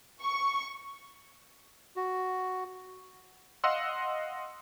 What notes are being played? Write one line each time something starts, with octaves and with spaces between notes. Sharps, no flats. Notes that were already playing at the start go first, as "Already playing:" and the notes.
C#6
F#4
D#5 F5 F#5 C6 E6